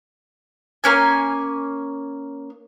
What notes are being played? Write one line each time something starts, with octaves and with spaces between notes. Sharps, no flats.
A#3 C#4 G#5